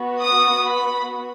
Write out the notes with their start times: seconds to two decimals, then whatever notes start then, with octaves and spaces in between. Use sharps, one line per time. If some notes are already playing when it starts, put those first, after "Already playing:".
Already playing: B3 F#4
0.20 D#6
0.66 B5